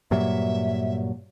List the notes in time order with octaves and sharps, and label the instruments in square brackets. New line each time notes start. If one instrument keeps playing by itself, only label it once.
[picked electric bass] G2 A#2 F#3 [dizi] E5